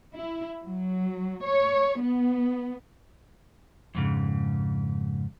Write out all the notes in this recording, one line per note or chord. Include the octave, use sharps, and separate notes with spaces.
E4
F#3
C#5
B3
F2 G#2 C#3